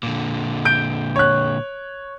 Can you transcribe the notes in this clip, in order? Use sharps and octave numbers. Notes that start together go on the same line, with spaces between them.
A#2 D3
G6 D7
C#5 F#6